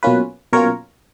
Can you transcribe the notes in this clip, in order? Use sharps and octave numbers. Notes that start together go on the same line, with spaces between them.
B2 F#3 A#3 C#4 F4 B4
B2 F#3 A#3 C#4 F4 A#4 C#5